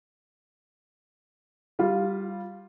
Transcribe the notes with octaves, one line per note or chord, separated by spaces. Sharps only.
G3 F4